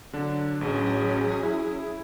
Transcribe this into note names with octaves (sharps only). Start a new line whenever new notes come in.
D3 F#3 D4
A1 F#3 C#4 G#4
E4